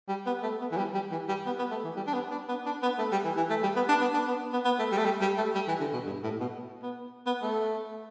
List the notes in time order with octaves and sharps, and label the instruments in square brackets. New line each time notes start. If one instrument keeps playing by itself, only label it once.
[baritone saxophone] G3
B3
A3
B3
E3
G3
G3
E3
G3
B3
B3
A3
E3
G3
D4
B3
D4
B3
D4
B3
A3
G3
E3
E3
A3
G3
B3
D4
B3
D4
B3
B3
B3
A3
G3
A3
G3
G3
A3
G3
E3
D3
B2
G2
A2
B2
B3
B3
A3